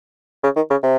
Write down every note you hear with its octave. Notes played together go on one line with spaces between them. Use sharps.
C#3
D#3
C#3
C3